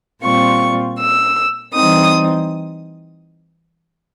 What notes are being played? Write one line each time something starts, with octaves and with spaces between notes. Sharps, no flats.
A#2 G3 C4 F4 C#6
E6
E3 G3 C4 D#4 D#6